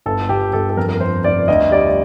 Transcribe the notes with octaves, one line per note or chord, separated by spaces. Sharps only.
G1 A4
G1 G4
G1 A4
A4
F2 A#4
A#4
F2 C5
F1 D5
D2 D#5
G3 D5